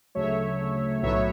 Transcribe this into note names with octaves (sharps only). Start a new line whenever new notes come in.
D2 C#3 F#3 A3 C#5 E5
B1 A2 F#3 B3 C#5 E5